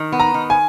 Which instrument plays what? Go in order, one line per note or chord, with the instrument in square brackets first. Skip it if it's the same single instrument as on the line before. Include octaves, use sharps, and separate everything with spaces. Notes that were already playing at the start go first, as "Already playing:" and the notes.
Already playing: [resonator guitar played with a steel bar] D#3
B3
[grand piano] A#5
[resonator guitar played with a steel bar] D#3
[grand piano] G#5